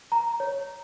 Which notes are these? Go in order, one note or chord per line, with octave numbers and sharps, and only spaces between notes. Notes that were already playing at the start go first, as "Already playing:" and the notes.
A#5
C#5